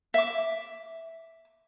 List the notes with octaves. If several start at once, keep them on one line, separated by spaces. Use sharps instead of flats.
E5 D6